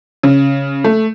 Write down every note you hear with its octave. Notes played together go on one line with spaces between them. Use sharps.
C#3
A3